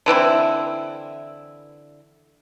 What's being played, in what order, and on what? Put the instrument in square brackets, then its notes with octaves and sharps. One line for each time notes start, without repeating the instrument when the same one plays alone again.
[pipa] D3 E3 C4 E4